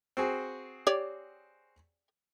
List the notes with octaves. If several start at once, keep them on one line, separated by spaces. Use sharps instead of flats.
C4 F#4 G#4
G4 C#5 D5